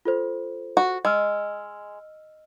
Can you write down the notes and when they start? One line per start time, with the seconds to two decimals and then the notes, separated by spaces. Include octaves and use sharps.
0.05 F4 A4 C5
0.77 F#4
1.05 G#3 D#5 E6 F6